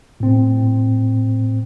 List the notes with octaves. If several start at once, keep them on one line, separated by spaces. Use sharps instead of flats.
A2 C4